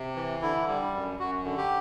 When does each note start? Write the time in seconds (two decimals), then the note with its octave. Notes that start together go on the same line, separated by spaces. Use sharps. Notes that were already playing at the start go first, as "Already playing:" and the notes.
Already playing: C3
0.16 E3
0.42 D3 E4
0.68 G3
0.93 F#2
1.20 F#2 F#4
1.45 D3
1.57 G4